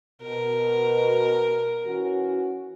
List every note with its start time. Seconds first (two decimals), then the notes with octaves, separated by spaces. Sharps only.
0.22 B2 A#4
1.86 E3 C#4 F#4